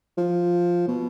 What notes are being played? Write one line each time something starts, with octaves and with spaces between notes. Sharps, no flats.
F3
B2